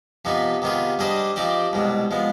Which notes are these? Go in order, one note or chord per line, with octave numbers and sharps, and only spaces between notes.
C3 F3 B3 D#4 B4
C3 D#3 B3 F4 G#4
G3 D4 G#4 C5 D#5
F3 C4 D#4 G4 D5
C2 B2 G#3
F3 G#3 B3